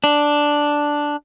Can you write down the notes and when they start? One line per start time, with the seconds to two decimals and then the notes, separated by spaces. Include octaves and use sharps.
0.04 D4